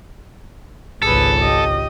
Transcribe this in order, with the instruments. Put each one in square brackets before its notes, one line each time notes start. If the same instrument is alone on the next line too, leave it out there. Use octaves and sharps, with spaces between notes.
[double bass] G#1 C#2 [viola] G#4 B4 [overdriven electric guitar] A4
[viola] G4 D#5